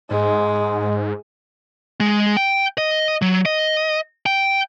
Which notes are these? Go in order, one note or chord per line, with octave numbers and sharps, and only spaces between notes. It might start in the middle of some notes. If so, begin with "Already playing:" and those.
G#2 G#3
G#3
G5
D#5
F#3
D#5
G5